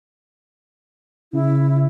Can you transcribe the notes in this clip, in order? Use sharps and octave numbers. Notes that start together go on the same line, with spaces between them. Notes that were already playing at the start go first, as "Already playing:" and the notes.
C#3 E4